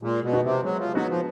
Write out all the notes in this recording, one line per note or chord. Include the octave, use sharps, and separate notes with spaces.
A#2 G#3
B2
B3 D#4 F#4 B4
C3
F#3 G#3
F3
F#3 B3 D#4 F#4 B4
F3